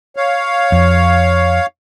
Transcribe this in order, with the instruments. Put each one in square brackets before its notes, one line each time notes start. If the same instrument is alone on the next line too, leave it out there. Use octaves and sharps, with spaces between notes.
[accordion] C#5 F5
[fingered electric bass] F2